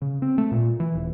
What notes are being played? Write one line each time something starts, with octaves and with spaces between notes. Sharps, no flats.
C#3
C4
A3
A#2
E3
D#1